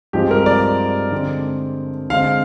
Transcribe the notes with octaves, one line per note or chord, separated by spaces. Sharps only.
G2 F3 G#3 C4 G4
A#4
D5
D3 G#3 C4
D3 G#3 C4 F5